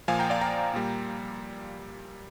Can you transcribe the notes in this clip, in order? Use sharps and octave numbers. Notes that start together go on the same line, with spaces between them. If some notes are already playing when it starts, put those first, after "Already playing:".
A#2 F3 A#3 F5 G#5
G5 A#5
D5 F5
G5 A#5
A#2 G3 A#3